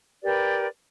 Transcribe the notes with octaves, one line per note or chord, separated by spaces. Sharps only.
G4 A#4 B4 D5